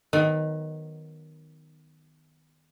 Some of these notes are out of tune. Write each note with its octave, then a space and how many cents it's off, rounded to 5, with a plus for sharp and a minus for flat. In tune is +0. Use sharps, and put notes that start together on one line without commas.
D#3 +0 F#3 +0 B3 +20